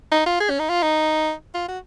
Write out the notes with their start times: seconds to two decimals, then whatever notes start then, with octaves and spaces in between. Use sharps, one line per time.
0.12 D#4
0.26 F4
0.40 G#4
0.50 C#4
0.59 D#4
0.69 F4
0.83 D#4
1.55 F4
1.68 F#4